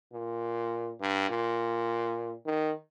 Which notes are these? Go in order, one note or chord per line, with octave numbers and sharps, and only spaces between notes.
A#2
G2
A#2
D#3